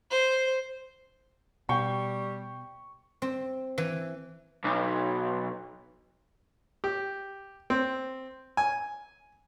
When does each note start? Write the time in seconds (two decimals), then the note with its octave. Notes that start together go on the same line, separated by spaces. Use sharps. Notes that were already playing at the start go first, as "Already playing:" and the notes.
0.11 C5
1.69 B2 G3 G5 C#6
3.22 C4
3.78 E3
4.65 B1
6.84 G4
7.70 C4
8.57 G#5